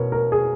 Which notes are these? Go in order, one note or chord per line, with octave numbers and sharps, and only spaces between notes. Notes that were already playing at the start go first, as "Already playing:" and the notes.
Already playing: B2 A#4 B4 C#5
A#4
G#4